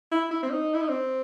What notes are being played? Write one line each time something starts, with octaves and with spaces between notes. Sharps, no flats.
E4
E4
C4
D#4
E4
D#4
C4